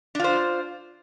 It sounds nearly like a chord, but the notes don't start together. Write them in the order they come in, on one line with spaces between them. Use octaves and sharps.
D4 F4 C5